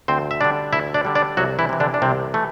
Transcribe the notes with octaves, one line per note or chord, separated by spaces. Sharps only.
D2 C4 C5
E5
D3 G3 D4 D5
D2 E4 E5
D4 D5
D3 G3
D4 D5
C2 F#3 F#4
E3 E4
C3 E3
D3 D4
D4
C2 C3 C4
E3 A3